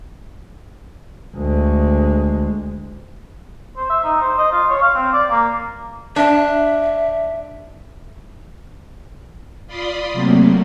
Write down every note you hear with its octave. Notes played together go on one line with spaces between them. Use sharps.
D2 G#3
C5
E5
D#4
C5
D#5
F4
C#5
F5
C4
D5
A#3
D4 E5
F4 D5 B5 C6 D#6
C3 F#3 A3 A#3